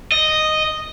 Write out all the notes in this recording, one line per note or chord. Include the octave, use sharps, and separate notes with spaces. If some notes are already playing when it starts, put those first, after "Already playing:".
D#5